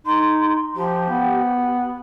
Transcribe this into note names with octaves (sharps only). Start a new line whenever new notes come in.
D#4 C6
F3 G4
B3